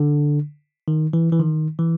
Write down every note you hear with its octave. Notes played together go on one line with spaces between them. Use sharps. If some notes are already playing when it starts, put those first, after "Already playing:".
Already playing: D3
D#3
E3
E3
D#3
E3